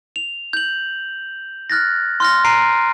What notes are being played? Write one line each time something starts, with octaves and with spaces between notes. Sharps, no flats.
F7
G6 F#7
F6 F#6 A6 A#6
C6 F6 A#6
A#5 C7 D7 D#7